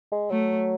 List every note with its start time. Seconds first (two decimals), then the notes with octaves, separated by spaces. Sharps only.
0.12 G#3
0.30 F#3 A3